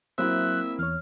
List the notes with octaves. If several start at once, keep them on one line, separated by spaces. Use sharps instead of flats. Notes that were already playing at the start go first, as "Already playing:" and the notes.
F#3 A#3 C4 E4 C5 E5 F#6
E2 C#5 F6